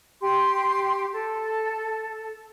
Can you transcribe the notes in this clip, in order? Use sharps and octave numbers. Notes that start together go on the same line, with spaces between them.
G4 C6
A4